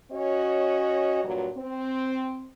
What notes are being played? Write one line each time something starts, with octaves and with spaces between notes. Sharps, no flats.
C#4 F#4 C#5 D#5
G2 A#2 F#3
C4